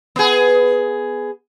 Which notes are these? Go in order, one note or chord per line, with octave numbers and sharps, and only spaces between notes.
B3 G#4